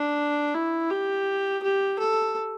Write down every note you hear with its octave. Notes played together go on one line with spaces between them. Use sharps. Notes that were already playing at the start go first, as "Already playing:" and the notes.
Already playing: D4
E4
G4
G4
A4